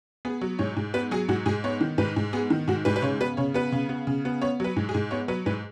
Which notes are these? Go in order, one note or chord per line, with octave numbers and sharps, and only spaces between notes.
B3 G#4
F#3
G#2 C#5
G#2
B3 B4
F#3 G#4
G#2 F#4
G#2 G#4
B3 C#5
D#3
G#2 B4
G#2
B3 G#4
D#3
G#2 F#4
G#2 B4
B4
C#3 C#5
B3 B4
C#3 C#5
B3 B4
C#3
B3
C#3
B3
B3 C#5
F#3 B4
G#2
G#4
G#2
B3 C#5
F#3 B4
G#2 B4